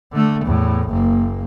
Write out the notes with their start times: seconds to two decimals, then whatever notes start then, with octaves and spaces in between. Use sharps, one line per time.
0.12 D3 A3
0.45 E2 A2
0.89 F#1 A#3